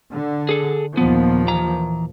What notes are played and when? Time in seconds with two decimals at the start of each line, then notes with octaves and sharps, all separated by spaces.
0.11 D3
0.49 G#4 A4
0.97 D#2 A#2 F3 B3
1.48 E3 A#5